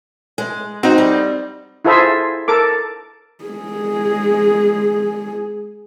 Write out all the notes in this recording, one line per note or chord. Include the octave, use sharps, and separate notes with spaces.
G#3
C4 D#4 F#4 C5
G3
E4 F4 G#4 A4 C5 E5
A4 A#4 D6
G#3 G#4